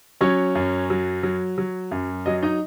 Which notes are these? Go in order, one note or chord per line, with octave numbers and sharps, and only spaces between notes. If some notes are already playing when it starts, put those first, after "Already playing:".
F#3 C#4 C#5
F#2
F#3
F#3
F#3
F#2
F#3 D#5
D#4 D#5